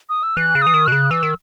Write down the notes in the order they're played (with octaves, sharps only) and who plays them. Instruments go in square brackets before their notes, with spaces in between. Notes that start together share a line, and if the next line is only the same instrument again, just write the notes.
[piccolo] D#6
E6
[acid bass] E3 [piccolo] F#6
[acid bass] C#3
[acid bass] E3 [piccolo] D#6
[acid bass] D#3
[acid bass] B2 [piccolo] F#6
[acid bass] C#3
[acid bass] E3 [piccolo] E6
[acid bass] D#3